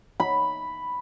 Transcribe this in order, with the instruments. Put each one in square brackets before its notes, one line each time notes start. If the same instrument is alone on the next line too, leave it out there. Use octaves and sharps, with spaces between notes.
[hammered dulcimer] B5